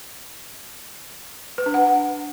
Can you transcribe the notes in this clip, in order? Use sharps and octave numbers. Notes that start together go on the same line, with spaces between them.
B4
D4
F#5